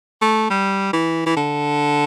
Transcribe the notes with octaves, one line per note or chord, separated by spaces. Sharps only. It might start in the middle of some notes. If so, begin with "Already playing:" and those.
A3
G3
E3
E3
D3